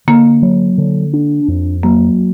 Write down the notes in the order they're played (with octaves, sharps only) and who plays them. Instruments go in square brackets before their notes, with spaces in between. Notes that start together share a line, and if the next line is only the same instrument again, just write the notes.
[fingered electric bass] D3 [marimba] A#3
[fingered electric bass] F#3
D3
D4
F2
[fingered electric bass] F#3 [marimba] A#3